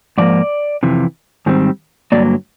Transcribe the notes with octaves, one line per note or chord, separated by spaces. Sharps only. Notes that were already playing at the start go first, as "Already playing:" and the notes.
G#2 F3 A#3 D5
F2 C3 E3
G#2 D#3 G3 C4
G2 D3 F#3 A#3 D5